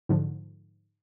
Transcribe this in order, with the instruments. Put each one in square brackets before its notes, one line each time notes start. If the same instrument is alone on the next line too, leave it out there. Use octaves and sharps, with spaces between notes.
[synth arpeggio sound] G#2 D3 F3